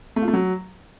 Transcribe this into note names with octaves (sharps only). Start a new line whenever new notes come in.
A3
F4
A3
F#3